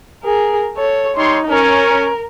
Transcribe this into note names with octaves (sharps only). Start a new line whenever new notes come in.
G#4 A#4
A4 C#5
G3 D#4 C#5 C6
C#4 A#4